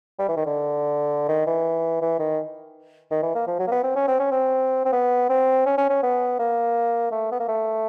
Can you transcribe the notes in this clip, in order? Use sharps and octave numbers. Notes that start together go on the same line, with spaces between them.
G3
E3
D#3
D3
D#3
E3
E3
D#3
D#3
E3
A#3
F3
F#3
A#3
B3
C4
C#4
C4
C#4
C4
C4
B3
C4
C#4
C#4
C#4
B3
A#3
A3
B3
A#3
A3